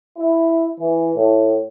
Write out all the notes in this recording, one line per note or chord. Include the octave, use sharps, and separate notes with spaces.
E4
E3
A2